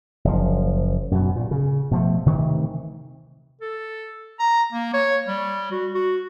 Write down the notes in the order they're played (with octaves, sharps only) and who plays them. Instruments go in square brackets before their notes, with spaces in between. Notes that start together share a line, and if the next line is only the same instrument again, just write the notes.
[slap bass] F#1 F3
F#2 B2
A#2
C#3
B2 F3 A3
C3 D#3 E3 A3
[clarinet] A4
A#5
A#3
C#5
G3
F#4
F#4